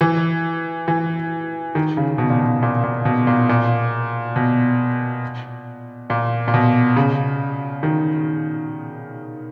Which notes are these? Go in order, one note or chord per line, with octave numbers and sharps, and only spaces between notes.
E3
E3
D#3
C#3
B2
A#2
B2
A#2
A#2
B2
A#2
A#2
B2
A#2
A#2
B2
C#3
D#3